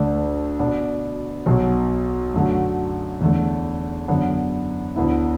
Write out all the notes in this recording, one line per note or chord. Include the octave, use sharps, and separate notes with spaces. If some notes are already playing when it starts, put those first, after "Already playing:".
Already playing: D2 D3 A3 D4
B2 B3 D4
B1 B2 F#3
F#2 D3 A3 F#4
E2 D3 A3
F#2 D3 B3
D2 D3 B3 E4